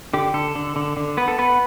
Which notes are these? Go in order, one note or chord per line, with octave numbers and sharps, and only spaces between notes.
D3 G4
D3 A4
D3
D3
D3
B3 B4
A4
B3 B4